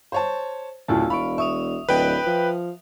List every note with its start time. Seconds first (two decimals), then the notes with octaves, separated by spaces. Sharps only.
0.12 C5 C#5 A5
0.88 D1 D2 A2 C#3 E4 F4 A5
1.10 E1 F5 B5 C#6 D7
1.38 E5 C#6 D#6 F7
1.89 D1 B4 G5
2.26 F3